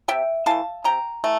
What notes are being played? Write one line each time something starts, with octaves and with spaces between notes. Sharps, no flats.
C3 E5 G5
E3 A3 F5 A5
C3 G5 A#5
E3 A3